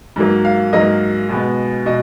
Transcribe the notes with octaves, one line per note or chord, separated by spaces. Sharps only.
G#2 F#3 A#3
F5
G#2 F#3 A#3 D#5
B2 G#3 B3
B2 D#5